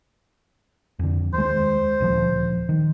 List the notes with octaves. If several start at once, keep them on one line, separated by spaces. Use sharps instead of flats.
F2 D3
D#2 G#3 C5
D#1 D2 F3
D#3